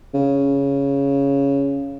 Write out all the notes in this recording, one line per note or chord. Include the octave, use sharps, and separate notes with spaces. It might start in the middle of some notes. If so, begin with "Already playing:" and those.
C#3